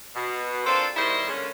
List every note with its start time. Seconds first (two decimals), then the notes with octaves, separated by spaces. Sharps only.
0.15 B2
0.66 A#3 C4 D4 F4 A4 C5
0.96 E2 D#3 G3 E4 C5 D#5
1.28 D3 G#3 A#3 C#4